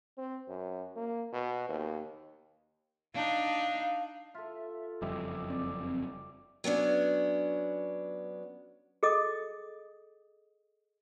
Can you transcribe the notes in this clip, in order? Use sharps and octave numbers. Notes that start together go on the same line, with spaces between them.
C4
F#2
A#3
B2
D#2
D4 D#4 F5
F4 A4 E5
F#1 F2 G3 G4 D#5 E5 D6
C4 D5
F#3 B3 C#4 D4
G#4 A4 D#5 D6 D#6